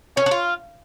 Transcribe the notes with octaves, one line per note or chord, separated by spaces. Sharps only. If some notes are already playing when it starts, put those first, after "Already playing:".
C#4 C#5
D4
F4